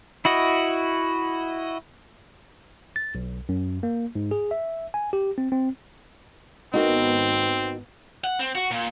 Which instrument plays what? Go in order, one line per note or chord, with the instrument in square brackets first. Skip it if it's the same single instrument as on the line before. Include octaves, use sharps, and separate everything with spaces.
[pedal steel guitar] E4 F#4 D#5
[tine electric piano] A6
B1
F#2
A#3
G#2
G#4
E5
G#5
G4
C4
C4
[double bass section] G#1 B3 [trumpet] C4 [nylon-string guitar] D#4 F#4 A#4
[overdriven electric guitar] F#5
C4
F#4
A#2